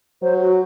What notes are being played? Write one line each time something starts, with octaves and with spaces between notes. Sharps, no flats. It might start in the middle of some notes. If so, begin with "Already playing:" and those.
F#3 C5
F#4